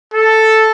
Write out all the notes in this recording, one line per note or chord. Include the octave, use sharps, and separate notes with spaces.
A4